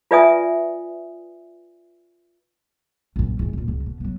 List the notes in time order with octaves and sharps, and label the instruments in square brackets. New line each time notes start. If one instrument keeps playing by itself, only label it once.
[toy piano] F4 B4 D5 E5 G#5 D#6
[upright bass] A#1 F#2
E2 A2
A#2 D3
C#2 F#2
B2
F#3 B3